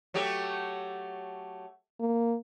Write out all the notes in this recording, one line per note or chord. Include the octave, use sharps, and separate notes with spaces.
F#3 A3 G4
A#3